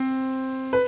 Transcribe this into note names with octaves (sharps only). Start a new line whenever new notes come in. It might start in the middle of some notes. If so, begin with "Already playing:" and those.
Already playing: C4 C5
B4